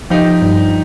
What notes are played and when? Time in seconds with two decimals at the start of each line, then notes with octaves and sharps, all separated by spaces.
0.10 F3 D#4 G4
0.42 G2